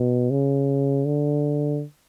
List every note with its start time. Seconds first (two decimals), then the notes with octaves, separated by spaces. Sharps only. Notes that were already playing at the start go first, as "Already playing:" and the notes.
Already playing: B2
0.30 C#3
1.06 D3